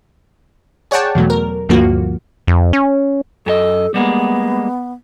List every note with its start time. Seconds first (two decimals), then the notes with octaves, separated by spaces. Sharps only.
0.91 G#4 C#5 D5 F#5 G5 A5
1.15 E2 B2 F#3 A3
1.30 A#4
1.69 D2 G2 F3 A#3 F4 F#4
2.47 F2
2.73 C#4
3.46 F#2 G4 A4 D#5
3.94 G3 G#3 A#3 B3